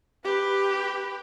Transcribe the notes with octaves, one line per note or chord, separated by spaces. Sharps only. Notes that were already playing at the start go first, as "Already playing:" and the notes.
G4 B4